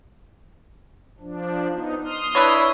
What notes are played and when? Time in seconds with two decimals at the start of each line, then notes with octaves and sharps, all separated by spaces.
1.20 F3 D4
1.72 B3 D#4
2.05 C6 D#6 F6
2.35 D4 E4 B4 C#5